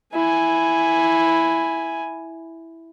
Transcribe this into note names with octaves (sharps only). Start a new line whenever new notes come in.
E4 G#5